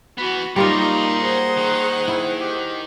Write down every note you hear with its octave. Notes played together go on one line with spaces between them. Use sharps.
E3 B3 F#4 B5
G3 A#3 D#4 F4 A#4 C#5 A#5 C6
G#4 C5 F#5
D#3
E4
G4